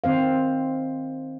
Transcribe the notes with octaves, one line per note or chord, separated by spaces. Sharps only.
D#3 C4 C5 F5